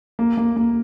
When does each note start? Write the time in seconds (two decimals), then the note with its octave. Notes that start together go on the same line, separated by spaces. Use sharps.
0.19 A#3
0.37 A#3
0.56 A#3